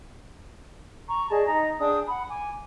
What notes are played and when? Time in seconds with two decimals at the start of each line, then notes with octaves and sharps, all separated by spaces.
1.08 A#5 C#6
1.29 G#4 D5 D#5 A5
1.46 D#4 D#5 A#5
1.79 D4 G#4 G5 D#6
2.08 F#5 B5
2.29 G#5 D6